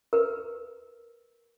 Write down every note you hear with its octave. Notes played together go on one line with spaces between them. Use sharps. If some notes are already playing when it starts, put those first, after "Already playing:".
A#4 B4